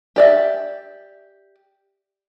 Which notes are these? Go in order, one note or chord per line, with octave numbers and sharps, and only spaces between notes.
G4 D5 E5